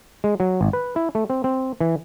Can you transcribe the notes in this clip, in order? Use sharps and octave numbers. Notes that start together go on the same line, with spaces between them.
G#3
F#3
G#1
B4
E4
A3
C4
C4
E3